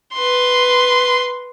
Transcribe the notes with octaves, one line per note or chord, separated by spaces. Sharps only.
B4 C6